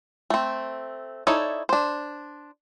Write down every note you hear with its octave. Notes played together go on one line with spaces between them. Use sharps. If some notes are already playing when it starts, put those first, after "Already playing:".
A3 C4
D#4 E4 A4 C#5 D5
D4 C5